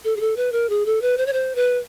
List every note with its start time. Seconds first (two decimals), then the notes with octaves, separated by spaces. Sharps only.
0.04 A4
0.16 G#4
0.20 A4
0.37 B4
0.52 A#4
0.70 G#4
0.86 A4
1.02 B4
1.17 C5
1.26 C#5
1.33 C5
1.55 B4